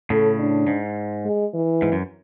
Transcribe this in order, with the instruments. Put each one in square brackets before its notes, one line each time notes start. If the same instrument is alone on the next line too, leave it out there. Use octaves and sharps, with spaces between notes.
[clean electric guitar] A2 C#3 [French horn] A4
[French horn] D4
[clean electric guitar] G#2
[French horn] G#3
E3
[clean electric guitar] G#2
F#2